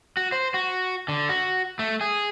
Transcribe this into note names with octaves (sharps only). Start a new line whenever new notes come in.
F#4
C5
F#4
D3
F#4
A3
G#4